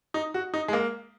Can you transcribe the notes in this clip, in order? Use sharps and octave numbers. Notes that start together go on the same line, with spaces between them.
D#4
F#4
D#4
G#3
A#3